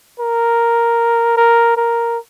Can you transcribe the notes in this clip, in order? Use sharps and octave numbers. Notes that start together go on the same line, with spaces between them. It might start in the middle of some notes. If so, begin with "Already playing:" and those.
A#4
A#4
A#4